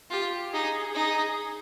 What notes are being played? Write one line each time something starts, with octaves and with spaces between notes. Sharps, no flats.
F4 G4
D#4 G#4
D#4